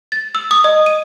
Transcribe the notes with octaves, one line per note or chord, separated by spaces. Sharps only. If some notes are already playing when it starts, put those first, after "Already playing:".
A6
E6
D#6
D#5
D#7